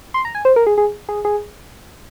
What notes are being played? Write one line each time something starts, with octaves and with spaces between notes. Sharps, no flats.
C6
A#5
G#5
C5
A#4
G#4
G#4
G#4
G#4